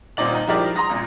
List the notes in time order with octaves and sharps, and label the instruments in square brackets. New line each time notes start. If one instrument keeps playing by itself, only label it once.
[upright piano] D#1 A#2 C4 D#4 D5 F#7
D#4
F3 G#3 E4 G4 A#4 D5
A#5 C6 D#6 A#6
G#1 A#2